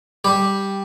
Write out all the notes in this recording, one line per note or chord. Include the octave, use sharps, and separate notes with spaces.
G3 G4